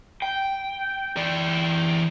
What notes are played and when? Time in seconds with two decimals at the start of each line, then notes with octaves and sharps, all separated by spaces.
0.22 G5
1.17 E3 D5